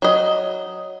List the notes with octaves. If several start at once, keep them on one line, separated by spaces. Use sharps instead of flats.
F#3 D#5